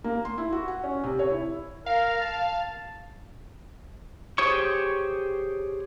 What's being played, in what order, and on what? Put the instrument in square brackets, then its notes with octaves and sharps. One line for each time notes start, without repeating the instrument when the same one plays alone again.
[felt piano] A#3
C6
E4
F#4
F#5
C#4
C3
C#5
E4
[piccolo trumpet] A#4 [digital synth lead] F5
[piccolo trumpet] A5
[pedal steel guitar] G4 G#4 C5 C#5 C#6